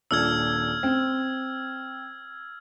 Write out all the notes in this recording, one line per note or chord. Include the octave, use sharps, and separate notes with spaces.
D#1 A#2 D4 E6 F6 G#6
C4